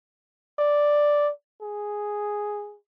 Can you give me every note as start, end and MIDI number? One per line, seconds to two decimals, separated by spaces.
0.59 1.31 74
1.62 2.76 68